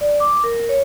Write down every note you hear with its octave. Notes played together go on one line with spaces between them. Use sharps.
D5
D6
A#4
C#5